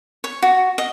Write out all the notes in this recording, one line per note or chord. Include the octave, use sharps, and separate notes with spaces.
C#5
F#4
D#5